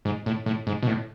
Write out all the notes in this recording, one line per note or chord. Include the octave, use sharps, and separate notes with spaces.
G#2
A2
A2
G#2
B2
A2